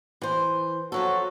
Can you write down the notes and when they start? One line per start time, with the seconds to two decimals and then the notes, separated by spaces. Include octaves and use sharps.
0.22 E3 C5
0.92 F3 F#3 F#4 A4